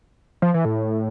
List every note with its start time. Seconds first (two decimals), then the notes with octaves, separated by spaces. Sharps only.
0.42 F3
0.54 E3
0.65 A2